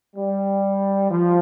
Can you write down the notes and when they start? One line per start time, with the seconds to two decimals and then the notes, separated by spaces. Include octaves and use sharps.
0.16 G3
1.10 F3